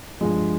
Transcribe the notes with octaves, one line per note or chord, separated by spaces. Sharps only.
G2 F3 G#3